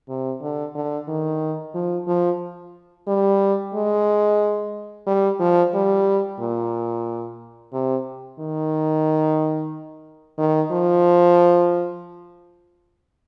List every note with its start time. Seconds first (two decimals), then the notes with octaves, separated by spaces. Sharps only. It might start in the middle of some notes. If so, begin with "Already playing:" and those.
0.09 C3
0.42 D3
0.75 D3
1.08 D#3
1.75 F3
2.07 F3
3.08 G3
3.74 G#3
5.07 G3
5.40 F3
5.74 G3
6.40 A#2
7.73 C3
8.39 D#3
10.38 D#3
10.72 F3